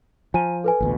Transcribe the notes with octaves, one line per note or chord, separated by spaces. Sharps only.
F3 G#5 A#5 D#7
A4 B4 G#5
A1 D2 B2